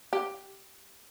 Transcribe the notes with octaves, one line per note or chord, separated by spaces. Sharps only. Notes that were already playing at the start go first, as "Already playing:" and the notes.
G4